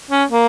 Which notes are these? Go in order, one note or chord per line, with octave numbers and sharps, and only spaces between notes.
C#4
A#3